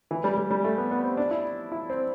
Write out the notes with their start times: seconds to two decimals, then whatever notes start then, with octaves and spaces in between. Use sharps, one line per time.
0.11 E3
0.24 G3
0.38 G3
0.51 G3
0.64 A3
0.78 B3
0.91 B3
1.04 C4
1.17 D4
1.31 E4
1.72 E4
1.90 C4